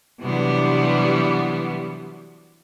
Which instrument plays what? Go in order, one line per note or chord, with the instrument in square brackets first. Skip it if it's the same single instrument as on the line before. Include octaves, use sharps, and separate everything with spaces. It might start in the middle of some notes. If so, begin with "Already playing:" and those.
[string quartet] C3 E3 F#3 G3 B3 D4